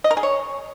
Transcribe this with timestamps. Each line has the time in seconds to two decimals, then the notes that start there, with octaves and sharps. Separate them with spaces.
0.04 D#5
0.11 A#4
0.17 G#4
0.23 C#5